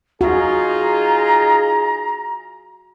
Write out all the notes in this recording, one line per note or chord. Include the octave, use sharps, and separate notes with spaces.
D#4 F4 F#4 G#4 A#5